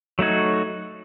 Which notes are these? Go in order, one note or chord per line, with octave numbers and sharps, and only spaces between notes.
F#3 A3 D#4 F#4 C#5